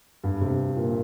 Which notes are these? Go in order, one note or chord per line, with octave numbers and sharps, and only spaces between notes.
G2
C3
A#2